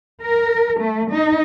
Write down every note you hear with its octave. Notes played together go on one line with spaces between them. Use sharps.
A#4
A3
D#4